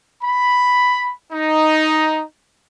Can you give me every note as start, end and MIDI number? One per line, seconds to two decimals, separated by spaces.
0.22 1.11 83
1.33 2.24 63